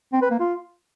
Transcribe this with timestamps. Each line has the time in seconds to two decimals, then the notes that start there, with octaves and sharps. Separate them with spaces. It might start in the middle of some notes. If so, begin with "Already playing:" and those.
0.13 C4
0.22 B4
0.31 A#3
0.40 F4